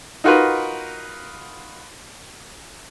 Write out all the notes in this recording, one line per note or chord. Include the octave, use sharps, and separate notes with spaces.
D#4 F4 F#4 A#4 B4